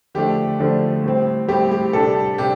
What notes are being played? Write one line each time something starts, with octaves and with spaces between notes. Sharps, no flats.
D3 F3 A3 D4 G4
D3 F3 A3 D4
A2 G3 C4
A2 G3 C4 G4
G4
C3 G3 D4 A4
C3 G3 D4 G4